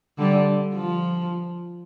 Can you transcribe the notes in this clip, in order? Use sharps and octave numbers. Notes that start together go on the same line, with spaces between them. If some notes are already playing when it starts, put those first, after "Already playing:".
D3 G3
F3